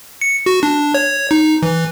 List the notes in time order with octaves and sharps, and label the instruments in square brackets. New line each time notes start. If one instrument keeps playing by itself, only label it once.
[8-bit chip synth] C#7
F#4
D4
C#5
D#4
E3